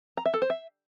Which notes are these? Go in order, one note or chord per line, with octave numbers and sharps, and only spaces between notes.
A#5
E5
A4
C5
E5